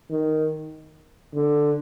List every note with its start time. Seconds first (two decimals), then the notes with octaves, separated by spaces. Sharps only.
0.11 D#3
1.34 D3